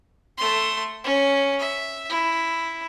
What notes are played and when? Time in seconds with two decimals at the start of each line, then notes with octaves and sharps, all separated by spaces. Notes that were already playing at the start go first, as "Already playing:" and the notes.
0.38 A3 C6
1.04 C#4
1.59 E5
2.09 E4